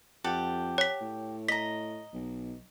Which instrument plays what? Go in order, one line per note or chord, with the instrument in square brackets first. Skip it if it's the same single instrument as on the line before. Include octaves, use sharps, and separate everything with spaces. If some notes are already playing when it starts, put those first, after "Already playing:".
[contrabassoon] F2 [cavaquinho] G4 A4 F#5
[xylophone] C#5 B6
[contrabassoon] A2
[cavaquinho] D#5 A#5 [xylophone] B6
[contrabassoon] B1